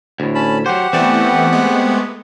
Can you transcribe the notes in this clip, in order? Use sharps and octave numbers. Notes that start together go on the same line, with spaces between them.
D2 A2
C#4 A5 B5
F#3 G4 C5 F#5
E3 A3 B3 C4 D5
G#3 A3 B3